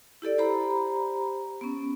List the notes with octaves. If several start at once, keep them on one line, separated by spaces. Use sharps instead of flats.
E4 G4 A4 D5
G4 C5 A#5 B5
B3 C#4